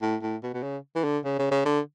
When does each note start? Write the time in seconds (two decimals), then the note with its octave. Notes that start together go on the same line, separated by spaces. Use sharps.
0.02 A2
0.22 A2
0.43 B2
0.54 B2
0.63 C#3
0.96 E3
1.04 D3
1.25 C#3
1.39 C#3
1.51 C#3
1.66 D3